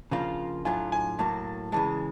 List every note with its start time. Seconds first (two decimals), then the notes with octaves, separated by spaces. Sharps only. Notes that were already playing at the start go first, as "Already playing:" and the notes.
0.11 C#3 F3 A#3 D4 F4
0.65 A2 F#3 A3 D4 F4 G#5
0.92 G#5
1.19 A2 F#3 A#3 A5
1.72 C#3 E3 G#3 A5